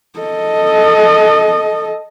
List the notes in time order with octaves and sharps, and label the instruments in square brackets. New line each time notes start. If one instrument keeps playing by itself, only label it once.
[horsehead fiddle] A4 D#5